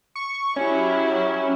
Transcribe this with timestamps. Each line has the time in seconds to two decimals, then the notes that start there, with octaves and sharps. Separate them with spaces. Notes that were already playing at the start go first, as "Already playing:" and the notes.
0.16 C#6
0.56 F#3 C#4 E4 G4